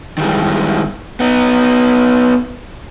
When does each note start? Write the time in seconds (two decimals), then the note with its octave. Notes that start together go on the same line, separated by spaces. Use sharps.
0.18 D#3 E3 G3 G#3
1.20 B3 D#4